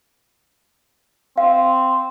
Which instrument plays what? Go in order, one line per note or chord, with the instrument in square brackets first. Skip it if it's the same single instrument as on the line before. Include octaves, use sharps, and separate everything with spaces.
[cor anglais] C4 [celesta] F5